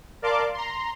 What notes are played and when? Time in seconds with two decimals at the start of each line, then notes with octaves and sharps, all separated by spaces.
0.22 A#4 D5 F5 A5 C6 D6
0.54 A#5 C6